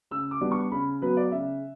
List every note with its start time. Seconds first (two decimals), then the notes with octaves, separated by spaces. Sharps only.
0.11 C#3 E6
0.31 D6
0.41 G3 B3 D4
0.52 C#6
0.72 C#3 B5
1.01 F#3 B3 B4
1.17 D5
1.31 C#3 E5